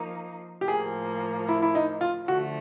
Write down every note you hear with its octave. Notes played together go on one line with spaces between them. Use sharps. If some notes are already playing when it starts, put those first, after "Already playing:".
Already playing: F3 A#3 D#4
G4
A2 F3 A#3 G#4
E4
E4
D#4
F4
D3 F3 A3 F#4